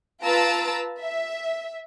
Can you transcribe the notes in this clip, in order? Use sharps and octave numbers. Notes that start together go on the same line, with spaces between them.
F4 B4 A5 A#5 E6 D7
E5